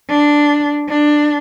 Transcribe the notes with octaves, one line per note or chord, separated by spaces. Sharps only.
D4
D4